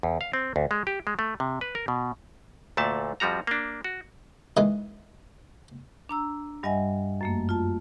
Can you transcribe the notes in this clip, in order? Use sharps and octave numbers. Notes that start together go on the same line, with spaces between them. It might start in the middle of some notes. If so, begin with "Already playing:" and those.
E2
F5
C4
D2
G#3
G4
G#3
A3
C3
B4
A#4
B2
D2 A#2 A3 A5
F2 F3 G3 F#4 A#5
A#3 D4
F#4
D#3 E3 G#3
D4 A#5 E6
G2 G3 D#5 E5 F#5 G#5
F#2 A3 A#3
F4 A5